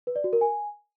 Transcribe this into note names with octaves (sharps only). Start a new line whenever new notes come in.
B4
D5
F#4
A#4
G#5